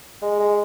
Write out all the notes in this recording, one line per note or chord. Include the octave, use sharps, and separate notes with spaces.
G#3
G#3